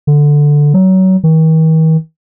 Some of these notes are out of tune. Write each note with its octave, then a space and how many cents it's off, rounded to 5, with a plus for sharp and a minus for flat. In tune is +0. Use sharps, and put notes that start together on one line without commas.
D3 +0
F#3 +25
D#3 +45